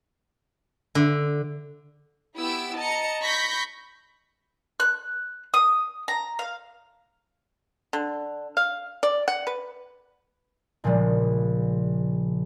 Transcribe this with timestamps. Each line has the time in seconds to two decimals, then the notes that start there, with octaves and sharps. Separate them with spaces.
0.95 D3
2.36 B3 E4 G4 E6 D7
2.77 D#5 A5 A#5 C#7
3.22 B5 C#6 G6 A#6 B6
4.80 F#6
5.54 D#6
6.08 A#5
6.39 F5
7.93 D3
8.57 F5
9.03 D5
9.28 F#5
9.47 B4
10.84 A#1 A#2 C#3 F3 G#3